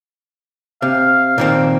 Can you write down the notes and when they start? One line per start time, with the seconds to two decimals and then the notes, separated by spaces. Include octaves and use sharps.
0.82 C3 F5
1.38 A#2 D#3 C4